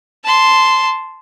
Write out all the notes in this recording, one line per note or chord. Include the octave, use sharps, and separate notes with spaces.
A5 C6